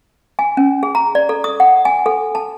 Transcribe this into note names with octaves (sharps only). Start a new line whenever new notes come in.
G#5
C#4
G#4
A#5
D5
A4
D#6
F#5
G#5
A4
A5